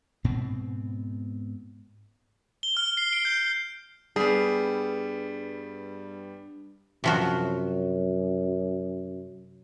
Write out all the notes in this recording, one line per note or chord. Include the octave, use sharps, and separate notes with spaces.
G#2 B2 B3 C4
G7
F6
C7
D7
G6
G6
G2 G3 B3 G#4
F#2 C3 F3 F#4